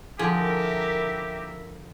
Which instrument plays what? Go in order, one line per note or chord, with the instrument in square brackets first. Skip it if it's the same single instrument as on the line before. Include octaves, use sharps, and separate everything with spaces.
[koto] D3 F3 [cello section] E4 A#4 E5 [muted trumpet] G4 [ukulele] G#4